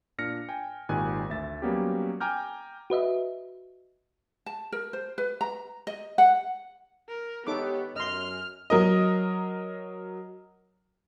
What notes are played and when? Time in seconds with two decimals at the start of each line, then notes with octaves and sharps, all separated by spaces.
0.18 A#2 D4 F6 A#6 C#7
0.49 G5 G#5
0.89 G#1 A#2 D#3 G4 G#5 F#6
1.30 D2 E5 A6
1.62 F#3 G3 A#3 B3 C#4 G4
2.20 G5 G#5 A#5 D6 F6 G6
2.90 F#4 B4 D#5 E5
4.46 A5
4.72 A#4
4.93 C5
5.18 B4
5.41 A#5
5.87 D#5
6.18 F#5
7.09 A#4
7.47 B3 D#4 G4 A4 C#5 D6
7.96 F#2 D#5 C6 F6
8.70 F#3 A#4 D#5